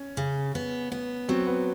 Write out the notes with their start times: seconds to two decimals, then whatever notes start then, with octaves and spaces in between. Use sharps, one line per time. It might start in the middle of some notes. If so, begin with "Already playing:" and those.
Already playing: C#4
0.17 C#3
0.55 B3
0.92 B3
1.29 F#3 C4
1.47 B3